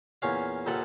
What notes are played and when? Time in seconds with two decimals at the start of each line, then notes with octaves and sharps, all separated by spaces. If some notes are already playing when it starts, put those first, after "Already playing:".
0.22 E2 A#2 C#4 F5
0.66 A#1 D#2 A#2 F3 A4 F#5